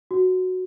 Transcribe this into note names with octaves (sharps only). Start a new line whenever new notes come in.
F#4